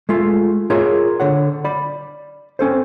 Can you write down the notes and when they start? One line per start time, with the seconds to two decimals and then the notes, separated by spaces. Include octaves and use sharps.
0.09 G#3 A3 F4
0.70 F4 G#4 A#4 C#5 E5
1.20 D3 C#5 F#5
1.64 D5 B5
2.59 C4 C#4 A4 C5